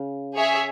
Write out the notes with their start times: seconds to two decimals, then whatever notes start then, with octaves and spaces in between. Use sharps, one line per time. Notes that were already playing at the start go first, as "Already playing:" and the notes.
Already playing: C#3
0.35 G#4 C#5 E5